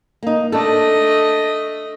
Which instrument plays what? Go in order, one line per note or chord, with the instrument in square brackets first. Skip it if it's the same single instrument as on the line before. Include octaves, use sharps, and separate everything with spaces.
[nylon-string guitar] A#3 D#4
[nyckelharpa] A3 D#5 [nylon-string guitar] D4 A4